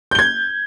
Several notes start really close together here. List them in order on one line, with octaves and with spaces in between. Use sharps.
G6 G7 G#6